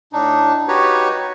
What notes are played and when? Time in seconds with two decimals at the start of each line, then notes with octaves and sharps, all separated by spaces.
0.13 A2 D4 D#4
0.68 D#4 F#4 G4 B4 C#5